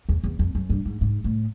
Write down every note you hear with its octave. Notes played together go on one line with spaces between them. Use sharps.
E2
E2
F2
F#2
G2
G#2
G#2
A2